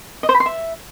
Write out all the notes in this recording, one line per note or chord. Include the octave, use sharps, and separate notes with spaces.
D#5
C5
B5
C6
E5